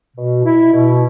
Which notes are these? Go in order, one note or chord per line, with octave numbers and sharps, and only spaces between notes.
B2
E4
B2